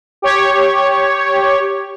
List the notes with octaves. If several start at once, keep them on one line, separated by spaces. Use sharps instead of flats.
G4 C#5